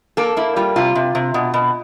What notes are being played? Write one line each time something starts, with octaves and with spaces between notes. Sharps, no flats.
A#3 A4
A#3 E4
G3 F4
C3 F4
C3
C3
B2
B2